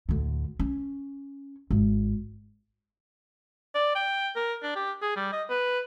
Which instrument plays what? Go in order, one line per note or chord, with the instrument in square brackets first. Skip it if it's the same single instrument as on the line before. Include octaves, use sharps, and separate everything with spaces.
[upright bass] D2 A2
C#4
G#1
[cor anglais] D5
G5
A#4
D4
G4
G#4
G3
D#5
B4